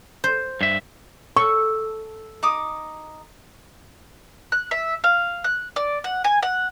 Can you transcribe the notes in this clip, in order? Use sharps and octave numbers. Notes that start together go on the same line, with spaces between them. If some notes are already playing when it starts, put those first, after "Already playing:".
C5
G2 E5
A4 C#6
D#4 D6 D#6
F#6
E5
F5
F#6
D5
F#5
G#5
F#5